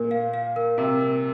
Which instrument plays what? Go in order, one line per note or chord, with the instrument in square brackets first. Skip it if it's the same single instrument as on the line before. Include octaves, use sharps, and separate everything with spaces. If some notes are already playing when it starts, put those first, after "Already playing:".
Already playing: [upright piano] A#2 [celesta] A#4
[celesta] F5
F5
A#4
[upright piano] C3 [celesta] A#4
[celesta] A#4